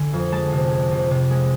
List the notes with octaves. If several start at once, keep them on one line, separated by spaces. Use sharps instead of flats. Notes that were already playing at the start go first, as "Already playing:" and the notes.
Already playing: D3 G#5
F2
G#3 A5
C3
G#3
C3
C3
G#3